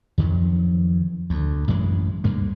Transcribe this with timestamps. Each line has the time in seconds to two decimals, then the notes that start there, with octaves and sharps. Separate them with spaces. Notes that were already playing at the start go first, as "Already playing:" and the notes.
0.18 F2 D#3 F3 F#3
1.30 D2
1.68 A1 F#2 E3 G#3
2.24 D2 G2 A#3